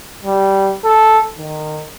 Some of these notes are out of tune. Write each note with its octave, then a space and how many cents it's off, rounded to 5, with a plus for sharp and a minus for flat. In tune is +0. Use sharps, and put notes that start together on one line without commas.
G3 -10
A4 -5
D#3 -20